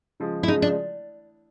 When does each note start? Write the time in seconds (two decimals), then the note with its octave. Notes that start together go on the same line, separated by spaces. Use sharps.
0.20 C#3 F3 G#3
0.43 E4
0.48 C#3 F3 G#3 D#4
0.62 D4